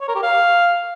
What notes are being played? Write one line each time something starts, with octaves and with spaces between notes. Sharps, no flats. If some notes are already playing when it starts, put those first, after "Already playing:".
C#5
A#4
G4
F5